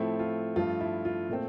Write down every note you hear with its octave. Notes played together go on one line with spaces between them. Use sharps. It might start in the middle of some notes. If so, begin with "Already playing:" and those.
Already playing: A2 F3 A3 C4 E4
F4
G2 F3 A3 F4
E4
F4
A#2 A3 C4